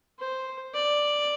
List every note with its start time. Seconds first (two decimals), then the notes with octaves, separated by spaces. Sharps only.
0.19 C5
0.75 D5